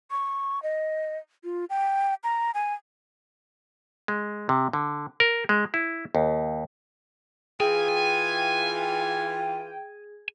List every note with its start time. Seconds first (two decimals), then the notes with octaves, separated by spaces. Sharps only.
0.11 C#6
0.63 D#5
1.44 F4
1.70 G5
2.24 A#5
2.54 G#5
4.08 G#3
4.49 C3
4.73 D3
5.20 A#4
5.49 G#3
5.74 E4
6.15 D#2
7.60 E3 F4 G#4 G5 G#5